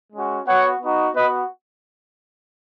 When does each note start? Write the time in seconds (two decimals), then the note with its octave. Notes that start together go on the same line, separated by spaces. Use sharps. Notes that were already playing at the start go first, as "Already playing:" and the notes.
0.13 G#3 C#4 F#4
0.47 B3 F#4 C#5 F#5
0.81 B3 D#4 F#4
1.15 B3 F#4 B4 D#5